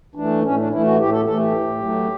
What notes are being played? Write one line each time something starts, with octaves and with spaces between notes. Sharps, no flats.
E3 A3 D4
A2 C#4
D4
E3 A3 E4
F#4
A2 G4
A4
E3 A3 A4
G4
A2
F#3 A3